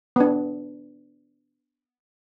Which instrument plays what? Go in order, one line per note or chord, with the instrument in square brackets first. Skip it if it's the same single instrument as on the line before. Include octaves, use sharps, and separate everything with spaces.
[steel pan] B3 D4